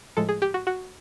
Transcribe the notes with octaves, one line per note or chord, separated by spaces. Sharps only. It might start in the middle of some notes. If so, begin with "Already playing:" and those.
A2 F3 G#3 A4
G#4
G4
F#4
F#4